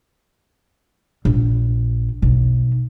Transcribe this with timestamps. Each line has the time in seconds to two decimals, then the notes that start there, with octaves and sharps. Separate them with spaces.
1.25 A#1
2.22 B1